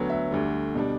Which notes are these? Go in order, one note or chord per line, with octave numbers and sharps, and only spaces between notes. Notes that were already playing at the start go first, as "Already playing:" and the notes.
Already playing: D2 D3 F#3 B3
E5
D2 D3 G3
B2 G3 D4